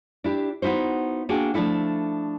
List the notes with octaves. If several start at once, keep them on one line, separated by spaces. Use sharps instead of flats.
D4 E4 G4
B3 D#4 E4 F#4 C5
A#3 D4 F#4 G#4 G5
F3 A3 D4 E4 A4